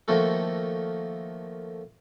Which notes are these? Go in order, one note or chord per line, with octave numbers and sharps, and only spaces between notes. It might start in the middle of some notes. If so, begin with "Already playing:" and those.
D#3 F3 A3 A#3 F#4 A4